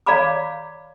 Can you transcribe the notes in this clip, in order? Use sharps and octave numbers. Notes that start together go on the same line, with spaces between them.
C#5 D5 F5 A#5 B5 D6